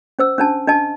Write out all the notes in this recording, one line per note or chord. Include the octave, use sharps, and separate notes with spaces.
C#4 C5 E6
C#4 D4 A5
D4 D#5 A5